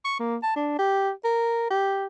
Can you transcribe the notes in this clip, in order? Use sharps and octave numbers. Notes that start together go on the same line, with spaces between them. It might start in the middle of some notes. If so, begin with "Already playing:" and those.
C#6
A#3
A5
D4
G4
A#4
G4